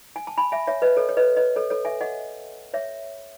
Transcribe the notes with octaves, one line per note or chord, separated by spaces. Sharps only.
G#5
A5
G#5 B5
E5 G#5
C#5 E5
B4 D#5
A4 C#5
C#5
B4 D#5
B4 D#5
A4 C#5
A4 C#5
E5 G#5
D#5 F#5
C#5 E5